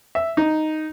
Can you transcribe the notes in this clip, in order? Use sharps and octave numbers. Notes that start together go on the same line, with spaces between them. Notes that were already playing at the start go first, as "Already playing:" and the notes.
E5
D#4